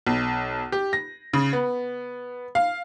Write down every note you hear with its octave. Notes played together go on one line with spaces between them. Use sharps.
B1
G4
A#6
C#3
B3
F5